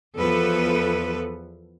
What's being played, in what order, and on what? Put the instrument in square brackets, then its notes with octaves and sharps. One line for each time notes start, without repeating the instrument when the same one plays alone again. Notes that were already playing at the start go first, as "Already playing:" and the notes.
[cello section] E2 F3 A4 B4